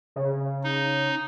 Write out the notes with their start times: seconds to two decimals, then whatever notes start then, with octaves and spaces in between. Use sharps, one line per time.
0.16 C#3
0.64 D#4